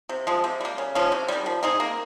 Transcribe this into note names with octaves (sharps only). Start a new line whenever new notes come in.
C3
F3 G#3
C3
G3 A#3
C#3
F3 G#3 C#4
C3
D#3 G3
F3
C4 D#4 G#4
A#3